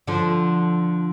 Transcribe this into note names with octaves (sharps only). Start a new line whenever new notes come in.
D3 F3